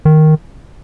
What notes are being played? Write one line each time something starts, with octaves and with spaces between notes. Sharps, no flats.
D#3